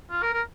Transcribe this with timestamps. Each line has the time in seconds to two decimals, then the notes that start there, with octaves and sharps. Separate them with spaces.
0.11 F4
0.22 A#4
0.33 A#4